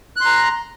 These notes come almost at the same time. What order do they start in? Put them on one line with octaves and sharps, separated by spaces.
F#6 C6 A#5